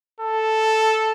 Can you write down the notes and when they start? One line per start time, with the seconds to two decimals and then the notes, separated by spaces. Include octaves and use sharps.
0.21 A4